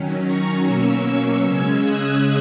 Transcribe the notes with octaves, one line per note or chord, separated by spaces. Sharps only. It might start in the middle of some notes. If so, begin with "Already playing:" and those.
Already playing: D#3 F#3 C#4
A#5 C#6
B2 F#3 A#3 C#4 C#6 E6
C#3 G#3 C#4 E6 G#6
D#6 F#6